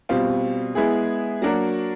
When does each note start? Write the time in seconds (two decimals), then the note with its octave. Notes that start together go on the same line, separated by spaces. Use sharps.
0.09 B2 G3 C4 F4
0.75 G#3 B3 E4 G#4
1.42 F#3 A#3 D4 F#4 A#4